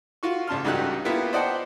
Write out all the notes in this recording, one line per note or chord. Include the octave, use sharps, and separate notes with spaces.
F4 F#4 C#6
A1 C#3 A5 C6 F6
C#2 G2 D#4 F#4 G4 F#6
A#3 B3 E4 F4 G4 E5
C5 D5 D#5 F#5 G5 A5